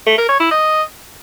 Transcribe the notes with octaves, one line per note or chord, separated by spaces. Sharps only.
A3
A#4
C#5
E4
D#5